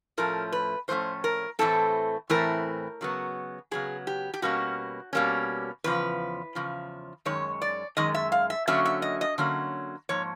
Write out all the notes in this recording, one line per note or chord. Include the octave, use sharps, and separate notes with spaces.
A2 F3 A3 C#4 A#4
B4
A2 F3 A3 C#4 C5
A#4
A2 E3 A3 C4 A4
A2 E3 A3 C4 A#4
C#3 F#3 B3
C#3 F#3 B3 G#4
G4
G4
B2 G3 A#3 C#4 F#4
B2 G3 A#3 C#4
E2 C#3 F3 B4
E2 C#3 F3
F#2 D#3 G#3 C#5
D5
F#2 D#3 G#3 D#5
E5
F5
E5
D3 F#3 A#3 C#4 E5
E5
D#5
D#5
D3 F#3 A#3 C#4
G#2 F3 A#3 C#5